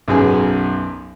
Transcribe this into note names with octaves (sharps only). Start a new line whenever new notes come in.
B1 F#2 G#4